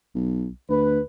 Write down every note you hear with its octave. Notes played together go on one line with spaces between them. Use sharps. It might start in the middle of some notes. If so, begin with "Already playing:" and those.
B1
D2 B4